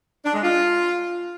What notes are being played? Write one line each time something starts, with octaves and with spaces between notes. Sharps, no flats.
D4
G#3
F4